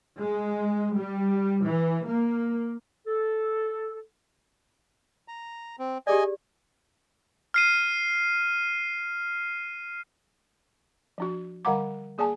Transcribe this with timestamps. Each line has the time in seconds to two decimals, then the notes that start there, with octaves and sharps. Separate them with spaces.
0.17 G#3
0.95 G3
1.64 E3
2.06 A#3
3.07 A4
5.28 A#5
5.79 C4
6.07 G4 G#4 D5 D#5 G#5
7.54 F6 C7 D#7
11.18 F3 D4 F#4
11.65 D3 G3 F5 F#5 A#5 D6
12.18 A#3 G#4 D5 G#5 A5